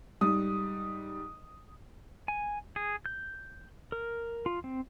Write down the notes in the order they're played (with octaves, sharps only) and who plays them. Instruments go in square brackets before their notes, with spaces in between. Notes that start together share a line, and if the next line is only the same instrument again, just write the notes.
[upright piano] G#2 G3 D#6
[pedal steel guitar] G#5
G#4
G6
A#4
F4
C4